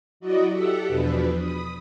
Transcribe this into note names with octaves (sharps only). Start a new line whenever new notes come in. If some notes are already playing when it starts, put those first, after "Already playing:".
F#3 E4 F#4 D5 D#5
G4 A4 E5 F#5
E2 B2 F3 D4 B4
B5 D#6